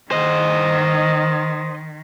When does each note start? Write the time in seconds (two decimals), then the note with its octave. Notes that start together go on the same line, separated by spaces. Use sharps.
0.11 D#3 C5 D#5